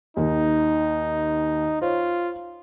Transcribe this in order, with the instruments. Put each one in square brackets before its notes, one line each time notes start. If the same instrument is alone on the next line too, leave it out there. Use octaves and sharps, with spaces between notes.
[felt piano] D#2 D#3 [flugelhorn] D#4
[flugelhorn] F4 [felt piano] C5 C#5